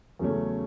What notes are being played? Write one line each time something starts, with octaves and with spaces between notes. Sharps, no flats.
E2 C#3 F#3 A3 C#4